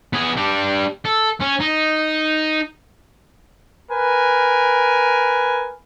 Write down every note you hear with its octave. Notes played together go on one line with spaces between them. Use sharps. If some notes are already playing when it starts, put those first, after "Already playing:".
B3 G#4
G3 D4
A4
C#4
D#4
A#4 B4 G#5